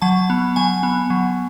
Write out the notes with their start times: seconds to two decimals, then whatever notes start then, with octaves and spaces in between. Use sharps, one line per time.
0.02 F#3 A5
0.30 B3
0.56 F#3 G#5
0.83 B3
1.10 F#3